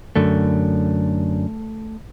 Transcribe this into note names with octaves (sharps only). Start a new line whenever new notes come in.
F#2 D3 A3